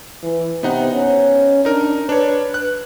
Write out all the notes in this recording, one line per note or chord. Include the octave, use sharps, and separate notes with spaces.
E3
C3 B3 D#4 F#5
C#4
D4 D#4 A#4
D4 B4 C#5
F#6